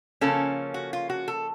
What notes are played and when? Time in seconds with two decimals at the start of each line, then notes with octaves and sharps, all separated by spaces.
0.21 C#3 F3 A#3 C#4 A4
0.74 F#4
0.93 F4
1.10 F#4
1.28 A4